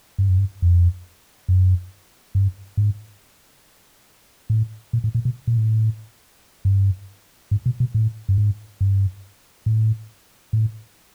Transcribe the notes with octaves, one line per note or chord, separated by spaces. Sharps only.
G2
F#2
G2
F2
F#2
G2
G#2
A2
A#2
A2
A#2
B2
A#2
A2
G2
G#2
B2
B2
A2
G2
G#2
G2
A2
A2